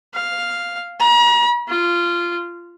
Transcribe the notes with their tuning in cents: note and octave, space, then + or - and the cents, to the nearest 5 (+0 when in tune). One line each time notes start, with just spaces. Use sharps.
F5 +0
A#5 +40
F4 -15